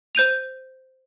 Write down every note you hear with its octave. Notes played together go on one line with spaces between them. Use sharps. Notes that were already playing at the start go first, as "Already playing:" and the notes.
C5 G6 D#7 F7